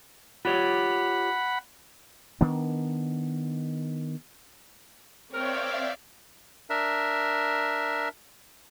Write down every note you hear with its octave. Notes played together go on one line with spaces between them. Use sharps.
F4 G4 C#5 F#5 B5
D#3 B3 D4
C4 A#4 C#5 D5 E5 F5 G5
D4 A#4 E5